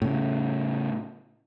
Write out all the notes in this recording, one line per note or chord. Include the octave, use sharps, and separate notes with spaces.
A2 C#3